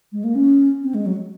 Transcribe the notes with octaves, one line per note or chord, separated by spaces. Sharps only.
G#3
A#3
C#4
C4
G#3
F#3